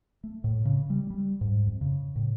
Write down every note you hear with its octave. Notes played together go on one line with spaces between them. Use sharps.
A3
A2
C#3
G3
G3
G#2
F2
C#3
A2